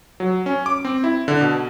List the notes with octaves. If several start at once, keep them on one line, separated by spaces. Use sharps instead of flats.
F#3
C#4
D6
C4
E4
D3
B2